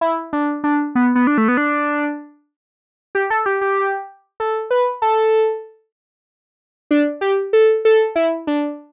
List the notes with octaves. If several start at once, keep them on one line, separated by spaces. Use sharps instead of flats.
E4
D4
D4
B3
B3
D4
A3
B3
D4
G4
A4
G4
G4
A4
B4
A4
D4
G4
A4
A4
E4
D4